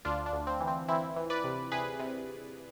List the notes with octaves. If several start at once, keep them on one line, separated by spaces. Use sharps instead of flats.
D2 D4 F4
D4
D2
C4
E3
C4
E3 C4 E4
E3
B4 D5
C3
C3 G#4 B4
C3